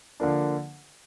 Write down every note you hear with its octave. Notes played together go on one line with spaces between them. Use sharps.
D3 F3 A#3 D4